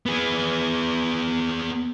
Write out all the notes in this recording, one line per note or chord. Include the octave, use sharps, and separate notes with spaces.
B3 G#4